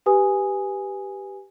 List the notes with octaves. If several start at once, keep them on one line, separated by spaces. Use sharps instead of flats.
G4 B4 G#5 D#6